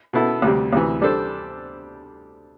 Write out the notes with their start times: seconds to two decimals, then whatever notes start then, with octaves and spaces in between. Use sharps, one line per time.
0.13 B2 B3 E4 A4
0.42 D2 C3 G3
0.73 D2 C3 E3
1.01 G3 D4 A4 C5